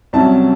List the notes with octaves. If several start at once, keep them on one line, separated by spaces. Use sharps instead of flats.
C2 C3 F#3 C#4 A5